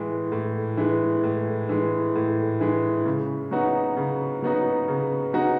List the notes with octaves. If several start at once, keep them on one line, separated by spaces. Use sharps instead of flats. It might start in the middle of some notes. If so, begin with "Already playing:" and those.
Already playing: A2 E3 G#3
A2
E3 G#3
A2
E3 G#3
A2
E3 G#3
C#3
F#3 B3 D#4 F#4
C#3
F#3 B3 D#4 F#4
C#3
F#3 B3 D#4 F#4